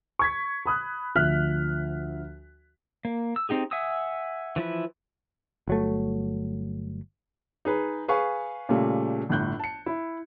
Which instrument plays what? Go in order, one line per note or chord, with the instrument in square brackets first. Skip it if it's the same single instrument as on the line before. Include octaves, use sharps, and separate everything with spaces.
[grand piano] C#6 G#6 B6
B5 D#6 F#6
D2 F3 E5 F6 F#6 B6
[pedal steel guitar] A#3
E6
C4 D#4 G4 G#4
E5 F#5 G#5 D#6 E6
E3 F3 E4 B4
[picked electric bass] G1 F#3 A3
[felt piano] D#4 G#4 B4
G#4 B4 F5 G#5 C#6
A#2 C#3 G3 A3
G1 A2 F#6 G6
A5 C#7
E4